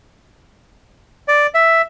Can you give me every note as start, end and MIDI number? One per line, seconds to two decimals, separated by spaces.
1.28 1.47 74
1.54 1.82 76